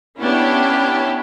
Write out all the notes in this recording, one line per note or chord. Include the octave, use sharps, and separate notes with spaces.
B3 C#4 D4 E4 G4